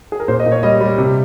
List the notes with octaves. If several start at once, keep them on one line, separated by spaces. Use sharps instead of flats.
G#4
A#4
A#2 C5
D#5
A#2
C#5
G3 D#5
G3
C3